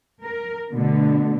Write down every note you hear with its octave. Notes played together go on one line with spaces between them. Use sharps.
A#4
B2 D3 A3